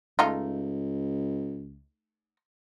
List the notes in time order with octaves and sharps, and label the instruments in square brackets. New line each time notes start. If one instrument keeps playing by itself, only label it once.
[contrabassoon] C#2 [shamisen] A3 D#4 F4